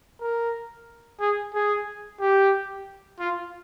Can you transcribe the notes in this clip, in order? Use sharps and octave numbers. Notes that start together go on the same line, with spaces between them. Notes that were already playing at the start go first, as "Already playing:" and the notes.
A#4
G#4
G#4
G4
F4